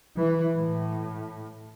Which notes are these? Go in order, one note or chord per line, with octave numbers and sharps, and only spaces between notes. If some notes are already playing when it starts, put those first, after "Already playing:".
E3
A2